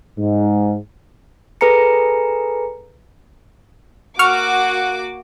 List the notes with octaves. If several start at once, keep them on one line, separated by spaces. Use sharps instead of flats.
G#2
G#4 A4 B4 G#5 A#5 C#7
A#3 F#4 F#5 C#6 D6 F6